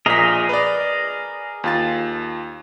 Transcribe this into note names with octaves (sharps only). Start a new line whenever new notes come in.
A#1 A#2 G#4 A#4 D#5 B6
B4 D5
D#2 F4 A6